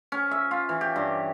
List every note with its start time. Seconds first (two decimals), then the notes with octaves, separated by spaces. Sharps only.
0.12 C#4
0.31 E5
0.51 F4
0.69 E3
0.81 G4
0.96 G2